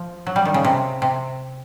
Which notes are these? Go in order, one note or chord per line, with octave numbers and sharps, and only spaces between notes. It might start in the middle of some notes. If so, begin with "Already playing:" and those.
Already playing: F3
F#3
G3
D#3
C#3
C3
C3